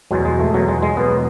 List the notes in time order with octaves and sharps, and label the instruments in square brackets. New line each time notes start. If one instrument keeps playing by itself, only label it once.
[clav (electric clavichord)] E2 B2 F#3 G#3
G#3
A3
E2 B2 F#3
G#3
G#3
E2 B2 F#3 B3